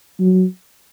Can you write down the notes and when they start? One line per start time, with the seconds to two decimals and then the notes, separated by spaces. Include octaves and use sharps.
0.20 F#3